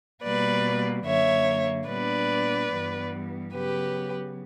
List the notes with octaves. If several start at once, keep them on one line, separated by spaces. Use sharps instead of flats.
B2 G3 A#3 B4 D5
F#2 D3 A#3 C#5 E5
A#2 G3 B3 D4 B4 D5
G2 E3 G3 B3
C#3 F#3 B3 G4 B4